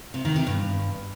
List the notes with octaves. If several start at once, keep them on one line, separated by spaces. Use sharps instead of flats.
C3
D#3
C3
G2